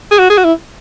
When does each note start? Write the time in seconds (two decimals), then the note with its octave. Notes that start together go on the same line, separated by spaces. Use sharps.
0.11 G#4
0.19 F#4
0.30 G#4
0.38 F#4
0.44 E4